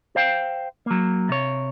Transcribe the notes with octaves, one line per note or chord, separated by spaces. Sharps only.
C5 F5 G5
F#3 A#3
C3 C#5